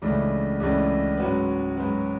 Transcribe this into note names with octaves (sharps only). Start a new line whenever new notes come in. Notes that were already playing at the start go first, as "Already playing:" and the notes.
C#2 C#3 E3 A3 D4
C#2 C#3 E3 A3 D4
G#2 F#3 C#4 F#4 B4
G#2 F#3 C#4 F#4 B4